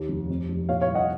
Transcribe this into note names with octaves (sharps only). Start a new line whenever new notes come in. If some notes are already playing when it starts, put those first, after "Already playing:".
Already playing: D#2
F1
F2
F1
A#2 C#5 F5
C#5 F5
C2
D#5 F#5